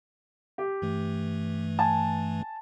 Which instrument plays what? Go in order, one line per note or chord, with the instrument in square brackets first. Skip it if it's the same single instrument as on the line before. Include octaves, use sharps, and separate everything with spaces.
[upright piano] G4
[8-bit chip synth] G2 E3 A3
[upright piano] G#5 A5